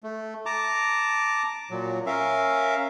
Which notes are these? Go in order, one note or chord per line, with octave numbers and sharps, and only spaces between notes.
A3
A5 A#5 D6
A#2 F#3
C#4 A#4 E5 F5